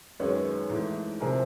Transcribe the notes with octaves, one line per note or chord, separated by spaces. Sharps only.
F#2 D#3 G#3 B4 C#5
G#2 E3 A3
C3 F3 G#4 A#4